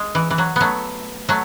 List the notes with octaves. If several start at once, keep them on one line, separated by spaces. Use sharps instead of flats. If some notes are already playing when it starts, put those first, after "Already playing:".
Already playing: G#3
E3
E3
F#3
F#3 A3 B3
F#3 A3